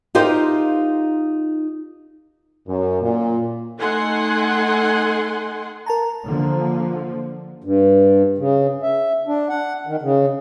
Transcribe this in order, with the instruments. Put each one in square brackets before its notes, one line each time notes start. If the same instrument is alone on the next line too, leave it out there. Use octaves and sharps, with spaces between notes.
[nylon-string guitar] D#4 F4 G4 A#4 C5
[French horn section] F#2
A#2
[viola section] A3 D#4 A4 F#5 G#5 C6
[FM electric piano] A#4 A5 A#5
[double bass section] D3 F3 A#3
[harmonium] G2
C#3
E5
D4
F#5
D#3
C#3